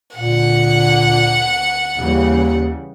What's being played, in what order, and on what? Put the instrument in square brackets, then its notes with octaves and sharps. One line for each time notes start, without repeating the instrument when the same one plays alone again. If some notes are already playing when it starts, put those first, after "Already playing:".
[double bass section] D2 D3 [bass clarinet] A#2 [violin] F#5
[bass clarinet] D#2 [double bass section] C#3 E3 G3